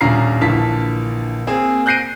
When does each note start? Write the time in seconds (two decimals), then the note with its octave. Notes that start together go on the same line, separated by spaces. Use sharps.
0.01 D#1 C#4 D4 A#4 A#5 C7
0.41 A#1 D3 E3 A#3 A5 B6
1.47 A#3 C4 G#4
1.86 F#6 G6 A#6 C7 D7 D#7